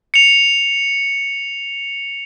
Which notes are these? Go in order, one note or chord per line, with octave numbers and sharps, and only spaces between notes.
C#7 F7